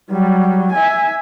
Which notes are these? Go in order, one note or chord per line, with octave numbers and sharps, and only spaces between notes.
F#3 G3
E5 G#5